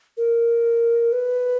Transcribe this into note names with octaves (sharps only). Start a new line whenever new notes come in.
A#4
B4